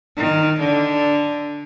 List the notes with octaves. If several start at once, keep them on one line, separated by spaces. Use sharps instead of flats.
D#3
D3